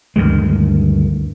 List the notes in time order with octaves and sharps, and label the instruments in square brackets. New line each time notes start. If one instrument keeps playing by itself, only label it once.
[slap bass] D2 G2 D#3 G#3